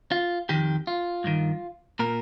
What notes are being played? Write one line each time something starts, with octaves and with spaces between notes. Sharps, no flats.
F4
F2 D#3 G4
F4
G2 D#3
A#2 A#4